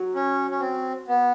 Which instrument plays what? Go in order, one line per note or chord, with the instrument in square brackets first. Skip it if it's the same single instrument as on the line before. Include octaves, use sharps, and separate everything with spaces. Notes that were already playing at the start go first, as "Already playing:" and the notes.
Already playing: [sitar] F#3
[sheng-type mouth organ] C#4
C#4
C4
B3